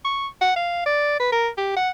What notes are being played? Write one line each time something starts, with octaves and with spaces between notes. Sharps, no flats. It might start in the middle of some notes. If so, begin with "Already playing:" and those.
C#6
F#5
F5
D5
B4
A#4
G4
F#5